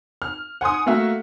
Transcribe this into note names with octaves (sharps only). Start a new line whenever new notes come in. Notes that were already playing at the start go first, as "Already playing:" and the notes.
F6
F#5 G#5 C6 D#6
A3 A#3 F#4 E5 F5